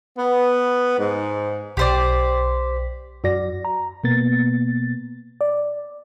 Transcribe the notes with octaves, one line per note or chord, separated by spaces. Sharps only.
B3
G#2
B1 G4 C5 D5 B6
F#2 F#4 D5 A#6
A#5
B2 A#3 B3 A6
D5